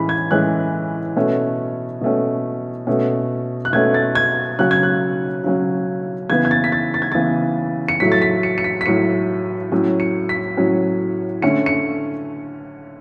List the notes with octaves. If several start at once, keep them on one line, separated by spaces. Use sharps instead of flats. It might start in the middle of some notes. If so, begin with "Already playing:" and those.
Already playing: A2 E3 G#3 C#4 B5
G#6
A2 E3 G#3 C#4 F#6
B2 A3 C#4
B2 A3 C#4
B2 A3 C#4
F#6
B2 A3 C#4 G#6
A6
G#6
C#3 F#3 C#4 F#6
G#6
F#6
C#3 F#3 C#4
C#3 E3 B3 G#6
G#6
A6
B6
A6
A6
G#6
C#3 E3 B3 A6
C#7
A2 F#3 A3 B6
A6
B6
C#7
C#7
B6
B6
A2 F#3 A3 C#7
A2 F#3 C#4
C#7
B6
A2 F#3 C#4
D3 A3 C#4 C#7
C#7